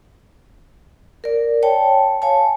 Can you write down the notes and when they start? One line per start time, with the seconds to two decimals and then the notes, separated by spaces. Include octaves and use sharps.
1.24 A#4 D5
1.63 C#5 G5 A5
2.22 C#5 F5 G#5 A5